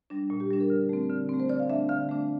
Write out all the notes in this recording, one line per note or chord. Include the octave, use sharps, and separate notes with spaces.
G3 D4
A#2
G4
G3 D4
A#4
D3
A3 C4
D3
A3 C4
C5
D3 D5
F5
A3 D4 E5
D3 F5
A3 D4